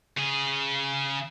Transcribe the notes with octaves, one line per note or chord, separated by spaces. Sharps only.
C#3 G#4